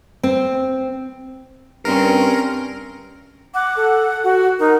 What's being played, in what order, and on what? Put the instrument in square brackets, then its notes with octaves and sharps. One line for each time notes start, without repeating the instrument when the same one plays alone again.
[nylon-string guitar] C4
[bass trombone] G2 [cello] C4 C#4 [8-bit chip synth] A#4
[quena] F#5 [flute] D6
[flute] A4
F#4
[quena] D#4 [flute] A#4